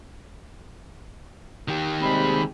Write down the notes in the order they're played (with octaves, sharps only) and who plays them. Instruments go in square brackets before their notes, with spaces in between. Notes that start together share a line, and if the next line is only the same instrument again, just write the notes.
[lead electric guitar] D#3 G4
[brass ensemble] C3 G3 G#3 [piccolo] B5